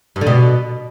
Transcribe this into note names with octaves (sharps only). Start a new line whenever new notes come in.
G2
D3
B2